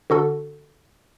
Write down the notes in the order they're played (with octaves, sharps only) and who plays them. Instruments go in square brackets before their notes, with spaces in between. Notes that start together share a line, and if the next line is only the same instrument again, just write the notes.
[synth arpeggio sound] D3 F#4 A4